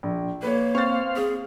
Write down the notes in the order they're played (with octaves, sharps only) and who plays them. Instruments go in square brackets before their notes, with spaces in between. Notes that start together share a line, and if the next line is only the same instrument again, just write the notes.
[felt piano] A#1
[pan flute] A#3 [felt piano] B4 C#5
[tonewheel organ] C4 F5 [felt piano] C#6 A6
[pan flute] G#4